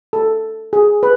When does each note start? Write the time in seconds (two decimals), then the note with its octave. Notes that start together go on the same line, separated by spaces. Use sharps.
0.13 A4
0.73 G#4
1.03 B4